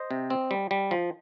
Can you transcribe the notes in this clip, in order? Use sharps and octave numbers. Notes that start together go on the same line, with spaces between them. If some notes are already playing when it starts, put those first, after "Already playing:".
Already playing: C5 D#5
C3
C4
G3
G3
F3